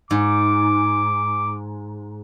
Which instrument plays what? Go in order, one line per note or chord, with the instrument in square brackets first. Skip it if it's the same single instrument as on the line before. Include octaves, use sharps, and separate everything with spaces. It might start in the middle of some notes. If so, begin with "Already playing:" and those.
[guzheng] G#2 [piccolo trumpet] D6